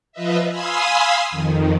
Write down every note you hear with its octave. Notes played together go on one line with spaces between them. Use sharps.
F3 F4 B4 D#5 E5
F5 G#5 B5 C6 D#6 E6
F2 D#3